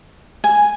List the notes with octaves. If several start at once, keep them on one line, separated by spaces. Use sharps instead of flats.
G#5